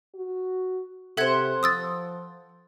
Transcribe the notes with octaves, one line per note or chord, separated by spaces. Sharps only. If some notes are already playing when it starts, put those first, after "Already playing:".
F#4
C3 A4 C5 E5 F#5 G#6
F3 D#6 E6 A6